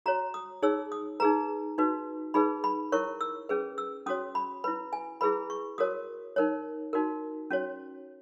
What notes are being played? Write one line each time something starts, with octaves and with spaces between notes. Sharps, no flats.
F#4 C#5 A#5
D#6
D#4 G#4 C#5 E6
D#6
D#4 G#4 B4 A#5
D#4 F#4 B4
D#4 G#4 B4 B5
B5
E4 A#4 C#5 C#6
E6
C#4 G#4 B4
E6
C#4 F#4 C#5 D#6
B5
E4 B4 B5
G#5
E4 G#4 B4 B5
C#6
F#4 A#4 C#5 D#6
D#4 A#4 C#5
D#4 F#4 A#4
C#4 F#4 C#5